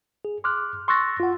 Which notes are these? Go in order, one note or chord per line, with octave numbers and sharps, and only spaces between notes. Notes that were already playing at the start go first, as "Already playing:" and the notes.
G#4
C6 D6 F6 F#6
C6 C#6 E6 F#6 A6 A#6
F4 F#5